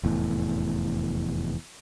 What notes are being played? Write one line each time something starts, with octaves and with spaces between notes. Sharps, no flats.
F1 E2 A2